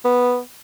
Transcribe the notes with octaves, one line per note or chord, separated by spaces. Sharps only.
B3